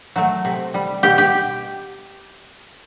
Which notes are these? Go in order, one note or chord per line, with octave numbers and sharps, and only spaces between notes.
F#3 A3
C3
G3
B2 G4
G4